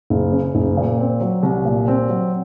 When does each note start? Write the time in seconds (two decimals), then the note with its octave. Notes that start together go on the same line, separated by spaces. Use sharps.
0.10 F#1
0.32 C#3
0.55 F#1
0.77 A#2
0.99 C4
1.21 F#3
1.43 C2
1.65 A#2
1.88 C4
2.09 F#3